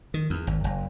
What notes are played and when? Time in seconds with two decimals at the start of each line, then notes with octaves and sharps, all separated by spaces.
0.14 D#3
0.30 E2
0.47 G#1
0.64 F#1